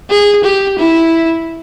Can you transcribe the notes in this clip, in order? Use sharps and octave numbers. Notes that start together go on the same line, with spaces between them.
G#4
G4
E4